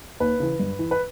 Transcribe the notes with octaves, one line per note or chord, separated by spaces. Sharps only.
D#2 B4
C#3 E3
G2
E3
B4